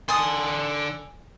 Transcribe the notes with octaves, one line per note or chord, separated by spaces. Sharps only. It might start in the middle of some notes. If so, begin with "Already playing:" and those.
D3 G#5 A5 C6 D#6